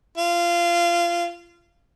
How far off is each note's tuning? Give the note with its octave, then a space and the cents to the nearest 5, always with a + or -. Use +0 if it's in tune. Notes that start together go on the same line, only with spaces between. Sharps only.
F4 -20